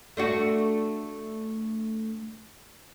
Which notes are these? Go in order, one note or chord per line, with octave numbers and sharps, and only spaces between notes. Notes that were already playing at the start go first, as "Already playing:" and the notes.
A3 D4 F#4